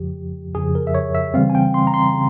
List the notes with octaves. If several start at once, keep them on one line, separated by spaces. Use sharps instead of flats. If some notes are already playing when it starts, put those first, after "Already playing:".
Already playing: F2 C#3 F3 G4
F2 C#3 F3 G#4
A#4
E5
C#5
E5
C#3 E3 G3 C4 F5
G#5
G5
C6
A#5
C6
C#3